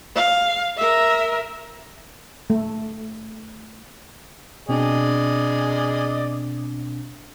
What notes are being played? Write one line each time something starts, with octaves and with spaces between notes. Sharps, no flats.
F5
A#4 E5
A3
B2 C4 D4 G#4 D5 D#5